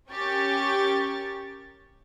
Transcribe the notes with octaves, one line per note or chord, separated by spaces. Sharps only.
C#4 G4 A#4 C#6 A6